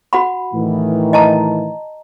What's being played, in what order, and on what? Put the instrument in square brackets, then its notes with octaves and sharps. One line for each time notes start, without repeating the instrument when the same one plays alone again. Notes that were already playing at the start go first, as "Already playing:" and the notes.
[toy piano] F#4 F#5 B5
[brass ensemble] A2 D#3 E3
[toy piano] D#5 A5 A#5